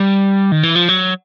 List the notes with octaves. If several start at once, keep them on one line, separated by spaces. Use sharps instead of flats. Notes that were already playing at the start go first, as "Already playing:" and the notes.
Already playing: G3
D#3
E3
F3
F#3